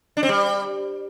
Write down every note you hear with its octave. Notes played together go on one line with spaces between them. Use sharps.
D4
C4
G3